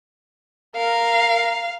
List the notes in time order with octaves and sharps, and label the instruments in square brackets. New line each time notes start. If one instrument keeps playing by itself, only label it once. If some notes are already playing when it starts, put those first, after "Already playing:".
[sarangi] A#4 [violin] F5